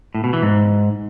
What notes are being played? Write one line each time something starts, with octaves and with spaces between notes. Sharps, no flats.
A2
B2
E3
G#2